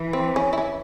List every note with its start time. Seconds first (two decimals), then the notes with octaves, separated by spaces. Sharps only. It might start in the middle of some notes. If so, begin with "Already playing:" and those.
Already playing: E3
0.13 C4
0.36 C#4
0.53 E4
0.58 C#4